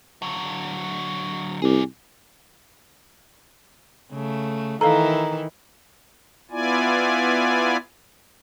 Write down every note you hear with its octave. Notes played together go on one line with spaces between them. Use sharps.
D3 F#3
C2 G#4 D5
C#3 A3
D#3 E3 E4 A4 A#4 F5 A#5
B3 E4 F4 D5 G#5